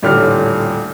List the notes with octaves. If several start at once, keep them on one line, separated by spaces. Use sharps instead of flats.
D#1 A1 D3 G4 F6